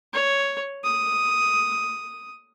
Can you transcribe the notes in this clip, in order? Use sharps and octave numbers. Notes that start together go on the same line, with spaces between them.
C#5
D#6